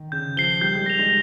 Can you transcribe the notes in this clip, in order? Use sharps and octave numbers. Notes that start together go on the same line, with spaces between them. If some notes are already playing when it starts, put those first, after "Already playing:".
Already playing: D#3
C#3 G6
F3 C7 G7
G3 G6
G#3
G#3 A#6 F7
G#3